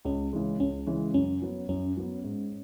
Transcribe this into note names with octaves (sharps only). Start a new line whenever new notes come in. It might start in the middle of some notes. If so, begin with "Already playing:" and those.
C#2 C#4
C#3 E3 G#3
C#2 C#4
C#3 E3 G#3
F#2 C#4
F#3 B3
F#2 C#4
F#3 B3
G#2